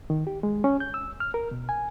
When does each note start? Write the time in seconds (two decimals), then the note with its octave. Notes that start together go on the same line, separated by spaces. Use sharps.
0.10 D#3
0.27 G4
0.43 G#3
0.64 C#4
0.80 G6
0.94 E6
1.20 F6
1.34 A#4
1.51 B2
1.69 G#5